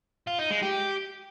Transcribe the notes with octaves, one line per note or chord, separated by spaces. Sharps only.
F4
D#4
G#3
G4